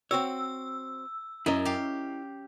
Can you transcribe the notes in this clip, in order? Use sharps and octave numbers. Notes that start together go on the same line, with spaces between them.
C4 F#4 C#5 E6
F#2 E4 A#4 D#5
G4 F5